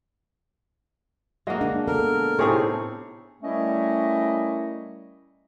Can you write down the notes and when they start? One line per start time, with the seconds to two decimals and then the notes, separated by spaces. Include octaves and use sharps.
1.47 G#3 A#3 F#4 D#5
1.61 D4
1.88 B3 A4 A#4
2.39 A2 C3 D#4 G#4 A4 C5 C#5
3.43 G3 A3 C#4 E4 A#4 D#5